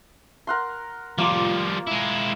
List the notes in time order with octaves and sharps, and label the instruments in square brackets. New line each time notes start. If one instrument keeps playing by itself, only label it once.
[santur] A#4 F#5 C6
[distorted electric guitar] F3 G3 [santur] A#3 F4 D6
[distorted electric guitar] G#3 E4